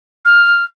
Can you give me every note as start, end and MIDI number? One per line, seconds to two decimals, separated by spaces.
0.25 0.64 89